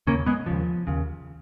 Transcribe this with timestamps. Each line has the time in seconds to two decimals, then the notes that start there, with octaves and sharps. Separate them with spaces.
0.07 D#2 C#3 A#3 C#4
0.26 G#3 B3
0.46 D#2 C#3 F3
0.87 D#2 C#3